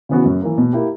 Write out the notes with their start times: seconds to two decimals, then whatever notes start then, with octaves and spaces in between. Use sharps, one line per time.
0.09 C#3 E3 B3 F#4
0.25 F#2
0.42 E3 A#3
0.58 B2
0.73 A#3 E4 G4